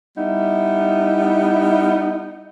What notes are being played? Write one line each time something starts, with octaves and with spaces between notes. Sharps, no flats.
G3 B3 D#4 E4